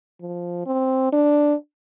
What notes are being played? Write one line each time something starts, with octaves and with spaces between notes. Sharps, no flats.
F3
C4
D4